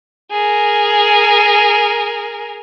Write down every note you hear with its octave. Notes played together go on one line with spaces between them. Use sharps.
G#4 A#4